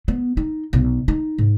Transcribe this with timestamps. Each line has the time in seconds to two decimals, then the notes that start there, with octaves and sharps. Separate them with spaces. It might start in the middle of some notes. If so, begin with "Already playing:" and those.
0.08 B3
0.37 D#4
0.73 B1
1.08 D#4
1.38 G#2